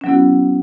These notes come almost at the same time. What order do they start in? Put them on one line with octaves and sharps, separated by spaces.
C#4 F#3 B3 E4 F#4